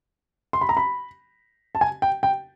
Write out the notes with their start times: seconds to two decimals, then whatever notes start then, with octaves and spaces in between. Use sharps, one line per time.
0.53 C6
0.61 B5
0.69 A#5
0.77 B5
1.75 A5
1.81 G#5
2.02 G5
2.23 G5